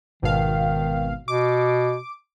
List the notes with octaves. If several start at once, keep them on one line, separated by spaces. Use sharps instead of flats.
G#1 B2 D#3 F5
B2 D6